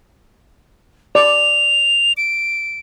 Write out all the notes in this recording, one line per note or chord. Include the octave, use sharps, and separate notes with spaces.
D5 F7
D7